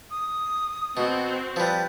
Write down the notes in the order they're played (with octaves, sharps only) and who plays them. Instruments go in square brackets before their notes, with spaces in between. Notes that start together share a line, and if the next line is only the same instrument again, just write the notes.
[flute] D#6
[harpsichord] B2 [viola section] C4 F#4
[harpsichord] F3 G3 [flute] B4